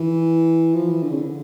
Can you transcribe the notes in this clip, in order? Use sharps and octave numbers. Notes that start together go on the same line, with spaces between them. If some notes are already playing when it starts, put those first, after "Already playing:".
Already playing: E3
F3
E3
D3
C#3
D3